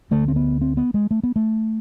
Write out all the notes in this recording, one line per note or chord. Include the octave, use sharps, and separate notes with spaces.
D2 D3 A3
C4
B3
C4
B3
G#3
A3
B3
A3